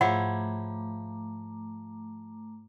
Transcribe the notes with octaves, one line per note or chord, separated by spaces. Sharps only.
G#2 F3 A3 E4 C#5 F#5 A#5 D6